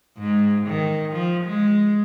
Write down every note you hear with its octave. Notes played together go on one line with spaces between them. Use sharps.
G#2
D#3
F3
G#3